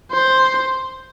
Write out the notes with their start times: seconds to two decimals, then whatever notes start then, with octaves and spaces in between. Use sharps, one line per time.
0.12 C5